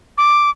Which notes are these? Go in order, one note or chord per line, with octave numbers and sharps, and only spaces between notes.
D6